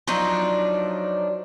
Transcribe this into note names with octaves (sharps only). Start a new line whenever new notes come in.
F3 F#3 D4 D#4